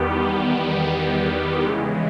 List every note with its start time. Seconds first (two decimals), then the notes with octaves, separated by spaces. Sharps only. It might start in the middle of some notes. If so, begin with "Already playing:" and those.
Already playing: E2 D#3 G3 B3 G4
1.64 C#3 E3 G#3